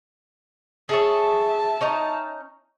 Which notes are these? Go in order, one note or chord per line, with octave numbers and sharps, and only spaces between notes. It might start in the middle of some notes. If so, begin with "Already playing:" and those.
G#4 A4 C#5 E5 A5
C#4 D#4 A#5